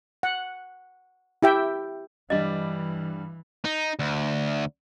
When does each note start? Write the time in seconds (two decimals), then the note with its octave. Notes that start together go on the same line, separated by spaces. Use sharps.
0.23 F#5
1.43 E4 G4 E5 G5
2.30 G2 E3 G3 D4 D#5
3.65 D#4
3.99 D2